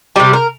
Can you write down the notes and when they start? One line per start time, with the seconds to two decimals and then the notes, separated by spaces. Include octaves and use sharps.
0.16 C3 G3 G4
0.33 A#4